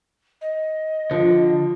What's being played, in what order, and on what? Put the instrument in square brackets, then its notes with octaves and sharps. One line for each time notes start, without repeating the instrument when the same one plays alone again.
[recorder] D#5
[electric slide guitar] D3 [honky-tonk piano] F3